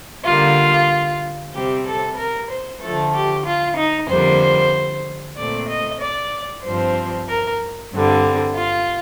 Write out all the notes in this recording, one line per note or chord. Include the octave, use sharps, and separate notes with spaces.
D3 G3 A#3 F4
C3 G3 C4 G4
A4
A#4
C5
D3 F3 A3 A4
G4
F4
D#4
F2 D3 G3 A#3 C5
A#2 A3 C4 D5
D#5
D5
G2 F3 C4 C5
A#4
G2 D3 G3 C4
F4